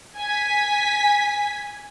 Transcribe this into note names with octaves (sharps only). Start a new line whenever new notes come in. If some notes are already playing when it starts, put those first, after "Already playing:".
G#5 B6